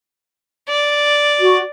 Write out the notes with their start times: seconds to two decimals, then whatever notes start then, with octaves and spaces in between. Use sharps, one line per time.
0.69 D5
1.40 F#4